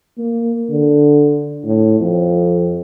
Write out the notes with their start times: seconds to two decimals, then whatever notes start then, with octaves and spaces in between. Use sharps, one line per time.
0.18 A#3
0.69 D3
1.65 A2
2.00 F2